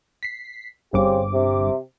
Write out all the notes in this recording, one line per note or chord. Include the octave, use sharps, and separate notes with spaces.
B6 C7
G1 G2 C#3 C4 G4 D6
C3